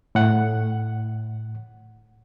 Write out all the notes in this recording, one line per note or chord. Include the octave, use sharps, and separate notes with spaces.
A2 F#5